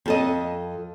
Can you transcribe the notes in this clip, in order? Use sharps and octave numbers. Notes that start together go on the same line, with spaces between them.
F2 A4 D#5